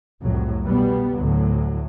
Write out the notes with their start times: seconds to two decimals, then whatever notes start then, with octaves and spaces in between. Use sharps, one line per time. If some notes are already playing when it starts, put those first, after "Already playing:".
0.23 C2 F2 A2 F#3
0.64 B2 G3 B3
1.16 D2 A2 F#3